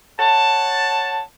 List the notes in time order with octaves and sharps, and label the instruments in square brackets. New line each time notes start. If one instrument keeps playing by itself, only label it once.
[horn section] C#5 F#5 A5